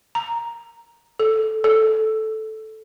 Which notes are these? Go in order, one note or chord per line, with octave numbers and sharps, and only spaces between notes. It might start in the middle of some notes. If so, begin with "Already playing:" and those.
A#5
A4
A4